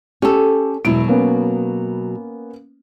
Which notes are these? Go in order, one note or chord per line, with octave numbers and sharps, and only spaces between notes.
C#4 G4 A4
E1 B2 F#3 E4 D7
A#3 B3 C#4